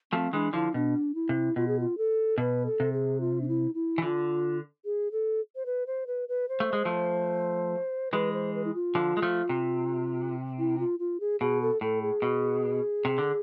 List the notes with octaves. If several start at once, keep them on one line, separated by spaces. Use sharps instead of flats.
F3 A3 C4
E3 G#3 D4
D3 F3 E4
B2 D4
E4
C3
B2 F4
G#4
F4
A4
B2 B4
A4
C3
G#4
F4
D4
E4
E4
E3
D3 F4
G#4
A4
C5
B4
C5
B4
B4
C5
A3
G#3
F3 A3
E3 G#3 B4
C5
B4
E4
F4
D3 F3
G#3
F3 A3
C3
E4
F4
F4
G#4
B2 G#4
A4
A2 A4
G#4
B2
C3
D3